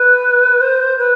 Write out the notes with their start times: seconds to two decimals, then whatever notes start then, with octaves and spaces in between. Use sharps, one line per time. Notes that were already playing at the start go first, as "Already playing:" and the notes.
Already playing: B4
0.61 C5
0.98 B4